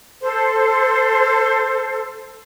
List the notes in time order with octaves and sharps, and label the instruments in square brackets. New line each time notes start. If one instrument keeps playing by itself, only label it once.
[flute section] A4 C5